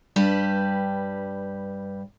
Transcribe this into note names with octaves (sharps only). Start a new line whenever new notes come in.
G2 G3 G4 B4 A5